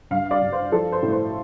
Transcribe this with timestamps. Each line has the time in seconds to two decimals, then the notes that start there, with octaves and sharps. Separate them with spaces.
0.11 G2 F5
0.31 D5
0.42 G2
0.52 C5
0.72 F3 A4
0.92 C5
1.03 A2
1.12 C5